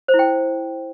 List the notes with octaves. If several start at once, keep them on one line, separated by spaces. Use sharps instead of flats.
C5
E4
G5